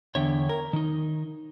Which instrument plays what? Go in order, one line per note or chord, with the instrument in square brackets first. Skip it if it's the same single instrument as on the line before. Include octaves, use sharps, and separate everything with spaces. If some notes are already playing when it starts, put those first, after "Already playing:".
[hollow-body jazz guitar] E2 D3 [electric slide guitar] C#5 E5 G5
[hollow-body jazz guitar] A#4
[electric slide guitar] D#3 D#4